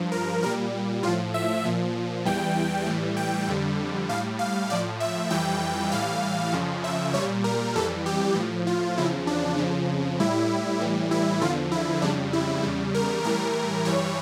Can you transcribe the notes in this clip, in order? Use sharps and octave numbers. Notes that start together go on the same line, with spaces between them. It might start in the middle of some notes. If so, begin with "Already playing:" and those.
Already playing: G2 F3
A#4
A#2 G3 A#4
A2 F3 F4
E5
A#2 F3
E2 E3 G3 G5
A2 E3 G3
G5
F2 D3 G3
A2 G3 F5
F5
A2 F3 D5
E5
F2 E3 G3 G5
A2 E3 G3 F5
F2 C#3 F3
E5
A#2 G3 C#5
A#4
F2 E3 G3 A4
G4
A2 F3
F4
E2 C#3 F3 E4
D4
F2 C#3 F3
A2 G3 E4
A2 E3 G3
E4
E2 D3 F3 F4
E4
F2 C#3 G3 D4
E4
E2 C#3 G3
A#4
A2 E3 G3 A#4
G2 E3 G3 C#5